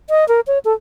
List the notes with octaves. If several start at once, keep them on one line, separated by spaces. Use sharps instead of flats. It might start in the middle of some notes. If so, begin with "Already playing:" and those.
D#5
A#4
C#5
A4